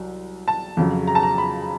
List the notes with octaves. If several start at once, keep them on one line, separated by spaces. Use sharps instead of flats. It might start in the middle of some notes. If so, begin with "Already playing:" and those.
Already playing: C2 F#3
A5
F2 C#3 F#3
A#5
A5
A#5
B5